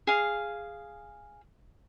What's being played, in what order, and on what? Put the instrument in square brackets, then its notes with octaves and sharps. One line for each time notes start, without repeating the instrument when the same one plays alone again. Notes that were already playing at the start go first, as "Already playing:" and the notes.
[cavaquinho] G#4 F5